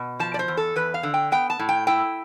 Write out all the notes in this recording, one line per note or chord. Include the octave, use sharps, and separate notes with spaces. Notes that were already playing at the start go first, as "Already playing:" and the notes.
Already playing: B2
F3 A5
D5
C5
E2
A4
E2 B4
F5
D3
G5
B3 G5
A5
A2
G5
E4 G5